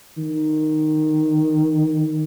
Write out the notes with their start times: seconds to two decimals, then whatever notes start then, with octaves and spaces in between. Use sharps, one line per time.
0.18 D#3